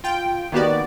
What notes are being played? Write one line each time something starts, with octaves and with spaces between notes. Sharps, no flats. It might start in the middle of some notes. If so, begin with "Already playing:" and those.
F4 G5
D#3 A#3 B3 F#4 G4 D5